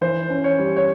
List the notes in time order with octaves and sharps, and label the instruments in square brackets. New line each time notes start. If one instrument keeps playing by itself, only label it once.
[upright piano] E3 C5
C#4
C#5
G3
C#5